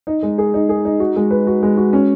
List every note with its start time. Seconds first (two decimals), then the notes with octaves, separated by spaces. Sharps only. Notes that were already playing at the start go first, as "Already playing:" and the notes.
0.07 D#4
0.23 G#3
0.38 G#4
0.54 D#4
0.69 G#4
0.85 D#4
1.00 F#4
1.16 G#3
1.31 B4
1.47 F#4
1.63 G#3
1.77 F#4
1.93 C#4